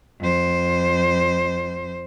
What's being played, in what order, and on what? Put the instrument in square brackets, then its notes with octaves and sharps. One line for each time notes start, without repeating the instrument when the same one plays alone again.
[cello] F2 C5